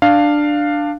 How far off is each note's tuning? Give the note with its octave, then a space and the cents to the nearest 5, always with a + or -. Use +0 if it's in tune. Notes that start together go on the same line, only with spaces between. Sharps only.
D4 +10 F5 +0